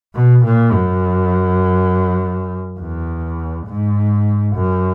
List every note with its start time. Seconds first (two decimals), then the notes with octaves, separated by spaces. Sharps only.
0.14 B2
0.44 A#2
0.73 F#2
2.79 E2
3.67 G#2
4.55 F#2